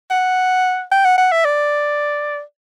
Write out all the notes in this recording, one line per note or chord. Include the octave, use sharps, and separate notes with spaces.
F#5
G5
F#5
F#5
E5
D5